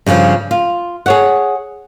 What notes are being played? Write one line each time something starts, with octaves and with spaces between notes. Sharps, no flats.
G2 C#3 E3 F3
F4
G#4 C#5 F#5